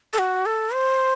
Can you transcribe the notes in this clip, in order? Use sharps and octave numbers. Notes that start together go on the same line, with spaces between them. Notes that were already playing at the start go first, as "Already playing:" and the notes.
A4
F#4
A4
C5